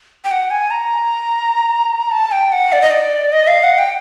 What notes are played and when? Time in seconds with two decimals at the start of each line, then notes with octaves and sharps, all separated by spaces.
0.24 G5
0.31 F#5
0.50 G#5
0.71 A#5
2.11 A5
2.32 G5
2.52 F#5
2.72 D5
2.82 D#5
2.91 D5
3.33 D#5
3.47 F5
3.63 F#5
3.78 G5